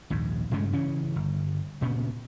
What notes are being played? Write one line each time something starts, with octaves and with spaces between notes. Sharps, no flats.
A#1 D#2 G#2
G2 C#3 G#3 A3
C#3 E3 C#4
G1
D2 A#2 C#3 B3